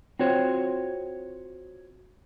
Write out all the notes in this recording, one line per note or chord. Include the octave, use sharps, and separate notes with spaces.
C4 F4 F#4 C5 C#5